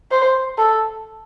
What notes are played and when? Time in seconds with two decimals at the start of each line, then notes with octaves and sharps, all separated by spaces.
0.11 C5
0.58 A4